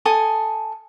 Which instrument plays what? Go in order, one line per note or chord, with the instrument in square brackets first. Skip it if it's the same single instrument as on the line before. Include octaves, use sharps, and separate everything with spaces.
[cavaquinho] A4 G#5 D#6